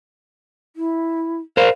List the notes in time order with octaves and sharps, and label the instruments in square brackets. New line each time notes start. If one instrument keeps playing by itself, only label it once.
[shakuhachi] E4
[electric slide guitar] A#4 C5 [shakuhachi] F5